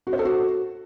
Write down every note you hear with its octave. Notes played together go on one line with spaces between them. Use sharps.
F#4
C5
A4
F#4